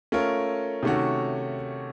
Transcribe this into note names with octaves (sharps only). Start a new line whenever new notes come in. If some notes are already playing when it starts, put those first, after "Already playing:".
A3 C#4 F4 A#4
C3 D#3 A3 C#4 F#4